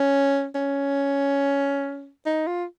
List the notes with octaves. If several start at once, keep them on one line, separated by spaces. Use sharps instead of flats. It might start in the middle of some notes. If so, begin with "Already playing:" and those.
Already playing: C#4
C#4
D#4
F4